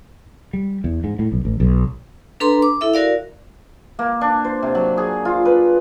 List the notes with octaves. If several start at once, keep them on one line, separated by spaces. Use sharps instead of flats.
G3
E2
G#2
A2
B1
A1
B1
D4 A4 B4 A#5 C6
D6
E4 A4 E5
F#4 A#4 D5 F5
A#3
D4
C5
C3
F#3
G#4
F4
B4